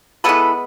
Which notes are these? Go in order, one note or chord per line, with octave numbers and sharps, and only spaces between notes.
E3 G#3 B3 A4 B4